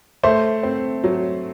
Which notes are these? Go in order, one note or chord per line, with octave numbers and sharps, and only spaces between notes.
A3 C5
C4
F#3